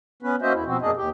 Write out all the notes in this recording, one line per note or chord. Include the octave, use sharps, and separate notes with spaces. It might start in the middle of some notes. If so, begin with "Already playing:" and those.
B3 C#4 B4
A#3 C#4 F#4 C5 D#5 E5
E2 E4
B2 F3 C4 F#4
F#2 A#3 D4 G#4 D#5
D#2 G4